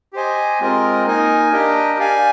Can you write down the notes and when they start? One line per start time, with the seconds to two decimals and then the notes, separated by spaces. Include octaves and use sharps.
0.13 G4 C5 D#5 G#5
0.60 G#3 C4 F4 A#4 D#5
1.06 A#3 D#4 A#4 D#5 G#5
1.52 D4 G4 A#4 D#5 G5
1.99 G4 D5 F5 G#5